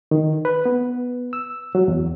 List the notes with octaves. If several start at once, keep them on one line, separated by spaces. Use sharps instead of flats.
D#3
B4
B3
E6
F#3
E2